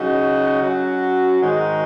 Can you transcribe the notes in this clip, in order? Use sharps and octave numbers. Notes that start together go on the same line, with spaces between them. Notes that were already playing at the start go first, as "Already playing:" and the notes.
Already playing: C#3 F#3 D#4 F#4
F#3 C#4 F#4
G#2 D#3 G#3 D#4 F#4